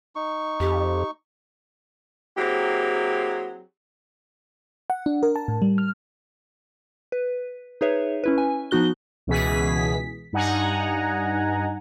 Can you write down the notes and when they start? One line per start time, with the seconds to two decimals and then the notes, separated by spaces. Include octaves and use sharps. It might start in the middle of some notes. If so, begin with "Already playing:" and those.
0.16 D#4 C#6
0.60 F2 G4
2.38 F#3 A#3 C4 E4 G4 G#4
4.90 F#5
5.06 D4
5.23 A#4
5.36 A5
5.48 A2
5.62 G3
5.78 F6
7.12 B4
7.81 D#4 G#4 B4 C#5 E5
8.24 C#4 E4 B4
8.38 G#5
8.71 F3 B3 D#4 F#4 F#6 G7
9.27 C#2 B2 E3 G#4 B6
10.33 G2 D#4 F#5 G#5 A#5